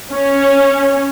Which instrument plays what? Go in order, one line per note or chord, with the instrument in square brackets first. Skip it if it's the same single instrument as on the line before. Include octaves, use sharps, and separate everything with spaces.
[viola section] C#4